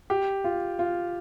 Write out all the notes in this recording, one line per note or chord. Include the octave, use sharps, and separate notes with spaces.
G4
F4
F4